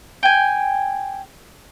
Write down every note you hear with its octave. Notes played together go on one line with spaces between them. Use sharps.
G5 G#5